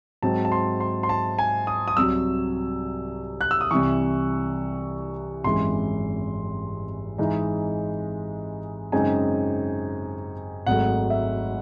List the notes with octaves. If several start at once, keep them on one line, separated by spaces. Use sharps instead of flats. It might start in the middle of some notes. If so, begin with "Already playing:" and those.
G#2 F#3 C4 A5
A5
C6
C6
C6
A5
G#5
D#6
D#6
C2 C3 F#3 E6
F#6
E6
D#6
C2 C3 E3 C#6
G#1 F#2 E3 G#3 C6
G#2 E3 G#3 D#4
F#2 C#3 G#3 C4 D#4 G#5
G#1 G#2 F#3 A3 F#5
E5